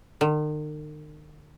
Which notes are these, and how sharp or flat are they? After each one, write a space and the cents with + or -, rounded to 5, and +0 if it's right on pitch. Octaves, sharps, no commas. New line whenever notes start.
D#3 -45